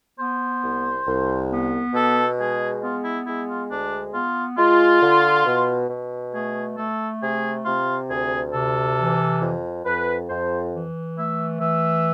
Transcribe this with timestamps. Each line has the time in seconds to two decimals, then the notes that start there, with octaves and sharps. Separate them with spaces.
0.19 B3 C5
0.63 C2
1.07 C2
1.51 B3
1.94 B2 A4
2.39 G#3 G#4
2.82 B3 F4
3.04 E4
3.27 G#3 E4
3.48 F4
3.70 D2 D4
4.14 B3 F4
4.58 G#3 F4
5.02 D3
5.46 B2
5.90 B2
6.34 A3 G#4
6.77 A3 A4
7.22 C3 G#4
7.66 C3 F4
8.10 D2 G#4
8.53 C3 A4
8.97 E3
9.41 F2
9.85 F2 B4
10.29 F2 C5
10.73 E3
11.17 A3 E5
11.61 E3 E5